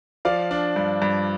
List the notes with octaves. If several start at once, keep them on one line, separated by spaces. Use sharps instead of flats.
F3 D5 F5
D4
G2
G2